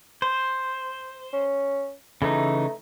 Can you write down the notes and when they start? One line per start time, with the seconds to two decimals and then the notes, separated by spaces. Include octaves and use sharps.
0.22 C5
1.33 C#4
2.22 C#3 E3 A3 D#4